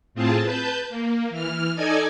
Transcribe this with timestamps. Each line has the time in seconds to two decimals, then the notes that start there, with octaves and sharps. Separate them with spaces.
0.14 A2 C4 F4 G#4 A5
0.43 B4 A5 G6
0.90 A#3
1.30 E3 F6
1.75 D#4 A4 D5 D#5 G#5 G#6